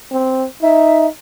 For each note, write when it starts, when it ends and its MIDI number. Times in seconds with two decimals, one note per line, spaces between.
0.12 0.45 60
0.62 1.07 63
0.62 1.06 76